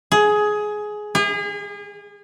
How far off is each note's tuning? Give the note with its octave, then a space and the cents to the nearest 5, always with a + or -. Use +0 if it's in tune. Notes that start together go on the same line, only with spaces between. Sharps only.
G#4 +15
G#4 -35